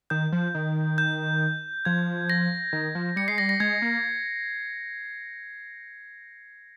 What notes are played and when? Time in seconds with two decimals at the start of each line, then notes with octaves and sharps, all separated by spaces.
0.10 D#3 G6
0.32 F3
0.55 D#3
0.98 G6
1.85 F3 G#6
2.30 A#6
2.73 D#3
2.95 F3
3.16 G3 C#7
3.28 G#3 C7
3.38 G3 A#6
3.49 A#6
3.60 G#3 G#6
3.82 A#3